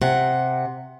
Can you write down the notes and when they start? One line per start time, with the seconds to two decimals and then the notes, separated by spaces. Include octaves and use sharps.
0.02 C3 F#5